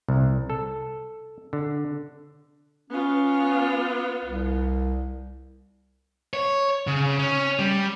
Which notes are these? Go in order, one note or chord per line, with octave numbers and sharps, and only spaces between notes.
C2
A4
D3
B3 C#4 F4
C2
C#5
C#3
C#4
G3